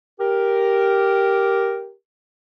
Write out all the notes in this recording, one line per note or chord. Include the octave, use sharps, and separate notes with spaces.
G4 A#4